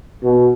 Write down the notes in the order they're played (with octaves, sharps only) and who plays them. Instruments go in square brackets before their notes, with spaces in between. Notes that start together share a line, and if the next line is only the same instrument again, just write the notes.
[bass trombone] B2